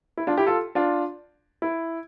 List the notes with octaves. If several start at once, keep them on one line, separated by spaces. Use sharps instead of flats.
E4
D4 F4
E4 G4
F4 A4
D4 F4
E4